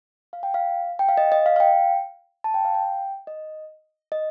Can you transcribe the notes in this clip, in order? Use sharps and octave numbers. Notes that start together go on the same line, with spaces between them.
F5
G5
F5
G5
F5
D#5
D#5
F5
F5
G5
A5
G5
F5
G5
D#5
D#5